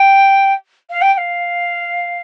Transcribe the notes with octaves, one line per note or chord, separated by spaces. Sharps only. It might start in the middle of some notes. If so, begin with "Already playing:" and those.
Already playing: G5
F5
G5
G5
F5